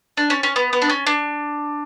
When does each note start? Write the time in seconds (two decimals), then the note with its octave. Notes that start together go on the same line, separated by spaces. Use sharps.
0.17 D4
0.30 C#4
0.43 C#4
0.56 B3
0.73 B3
0.82 D4
0.89 C#4
1.07 D4